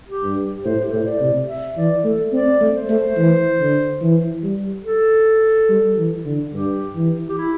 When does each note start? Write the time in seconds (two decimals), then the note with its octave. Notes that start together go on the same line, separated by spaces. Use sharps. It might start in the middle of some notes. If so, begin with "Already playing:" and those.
0.08 G4
0.23 G2
0.37 G4
0.64 A2 C5
0.83 G4
0.90 A2 A4
0.98 C5
1.06 D5
1.21 C3
1.49 E5
1.76 E3 D5
2.04 A3 A4
2.33 C4 D5
2.61 A3
2.75 C5
2.89 A3
3.17 E3
3.59 D3
4.01 E3
4.43 G3
4.84 A4
5.69 G3
5.97 E3
6.25 D3
6.53 G2 G4
6.95 E3
7.29 G4
7.38 E4